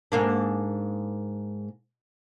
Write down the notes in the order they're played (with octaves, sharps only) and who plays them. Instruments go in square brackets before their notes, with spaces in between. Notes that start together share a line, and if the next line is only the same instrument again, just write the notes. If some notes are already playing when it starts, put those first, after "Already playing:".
[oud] G#2 A#3 D4